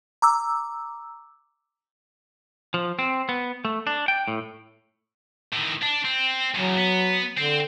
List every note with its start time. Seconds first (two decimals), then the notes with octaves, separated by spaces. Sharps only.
0.22 A#5 D6 E6
2.74 F3
2.99 C4
3.29 B3
3.65 A3
3.87 D4
4.08 G5
4.28 A2
5.53 A2 D#3
5.83 D4
6.05 C4
6.55 E2 C#3 F#3
6.77 B3
7.37 D3 C4